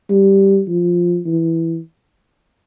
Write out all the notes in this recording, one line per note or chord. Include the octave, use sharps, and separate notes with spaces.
G3
F3
E3